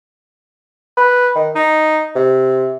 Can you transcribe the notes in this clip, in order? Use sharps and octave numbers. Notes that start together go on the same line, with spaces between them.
B4
D#3
D#4
C3